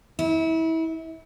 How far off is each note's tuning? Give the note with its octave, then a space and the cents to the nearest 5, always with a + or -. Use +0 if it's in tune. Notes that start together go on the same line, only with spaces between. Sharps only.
E4 -30